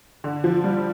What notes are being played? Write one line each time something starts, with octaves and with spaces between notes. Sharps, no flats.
D3
F3
G3